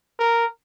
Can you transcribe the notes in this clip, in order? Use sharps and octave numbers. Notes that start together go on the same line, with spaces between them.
A#4